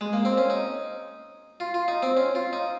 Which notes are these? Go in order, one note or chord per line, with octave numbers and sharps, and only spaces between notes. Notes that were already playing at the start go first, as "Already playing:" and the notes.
G#3
A#3
C4
C#4
D#4
F4
F4
D#4
C4
C#4
F4
D#4